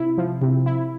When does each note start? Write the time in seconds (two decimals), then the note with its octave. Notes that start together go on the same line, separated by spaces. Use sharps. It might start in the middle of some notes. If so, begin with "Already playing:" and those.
Already playing: C3 E4
0.18 F3
0.42 C3
0.66 E4